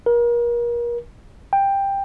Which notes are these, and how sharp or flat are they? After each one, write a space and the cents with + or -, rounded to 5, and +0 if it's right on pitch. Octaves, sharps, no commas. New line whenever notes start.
A#4 +35
G5 +10